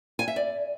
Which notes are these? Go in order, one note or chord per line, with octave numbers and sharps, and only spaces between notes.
G#5
E5
D5